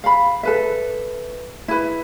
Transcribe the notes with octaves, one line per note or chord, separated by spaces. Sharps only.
F5 B5
A4 B4 E5
E4 B4